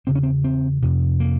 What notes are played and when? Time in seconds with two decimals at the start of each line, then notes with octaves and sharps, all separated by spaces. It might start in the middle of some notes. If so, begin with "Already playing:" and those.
0.07 E2 C#3 C4
0.15 C#4
0.23 C4
0.44 C4
0.82 F2 C3
1.20 A#3